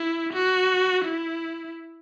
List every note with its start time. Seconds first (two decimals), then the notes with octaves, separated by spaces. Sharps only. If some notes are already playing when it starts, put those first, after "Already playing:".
Already playing: E4
0.33 F#4
1.05 E4